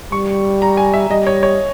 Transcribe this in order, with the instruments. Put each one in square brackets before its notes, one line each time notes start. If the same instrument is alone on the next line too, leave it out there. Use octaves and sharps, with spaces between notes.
[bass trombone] G3 [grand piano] C#6
[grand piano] A#5
G#5
E5
[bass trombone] G3 [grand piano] D#5
[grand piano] C#5
C#5